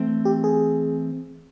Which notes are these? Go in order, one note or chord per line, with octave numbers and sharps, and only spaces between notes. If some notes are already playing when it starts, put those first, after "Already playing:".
Already playing: E3 A3 C4
G4
G#4